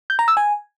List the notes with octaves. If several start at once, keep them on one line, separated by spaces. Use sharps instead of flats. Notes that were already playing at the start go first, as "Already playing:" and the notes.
G6
A#5
E6
G#5